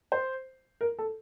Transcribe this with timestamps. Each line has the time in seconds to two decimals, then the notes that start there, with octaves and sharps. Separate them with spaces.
0.12 C5
0.81 A#4
0.99 A4